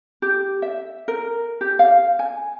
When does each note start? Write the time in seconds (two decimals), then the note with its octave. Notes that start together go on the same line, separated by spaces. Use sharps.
0.22 G4
0.62 E5
1.08 A#4
1.61 G4
1.79 F5
2.19 G#5